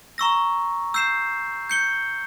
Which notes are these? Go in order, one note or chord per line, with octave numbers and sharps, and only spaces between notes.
A#5 C#6 E6 A#6
E6 G6 C7 E7
G6 C#7 G7